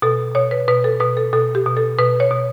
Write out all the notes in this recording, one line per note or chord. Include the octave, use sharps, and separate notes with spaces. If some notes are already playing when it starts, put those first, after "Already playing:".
B2 A4
B2 C#5
B4
B2 B4
A4
B2 B4
A4
B2 A4
G4
B2
A4
B2 B4
C#5
B2